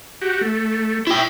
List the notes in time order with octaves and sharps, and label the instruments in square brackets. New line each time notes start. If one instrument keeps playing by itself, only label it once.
[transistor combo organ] F#4 G4
A3
[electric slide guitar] E4 G5 [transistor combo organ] E5